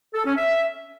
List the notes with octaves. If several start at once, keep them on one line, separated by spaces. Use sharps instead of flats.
A4
C#4
E5